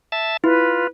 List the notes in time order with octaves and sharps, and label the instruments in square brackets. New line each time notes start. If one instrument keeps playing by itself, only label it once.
[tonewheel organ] E5 A5
[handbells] E4 [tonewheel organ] F4 [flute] B4